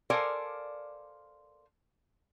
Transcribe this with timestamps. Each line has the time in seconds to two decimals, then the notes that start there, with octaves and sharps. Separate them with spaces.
0.10 A4 A#4 C5 D5 F5 G#5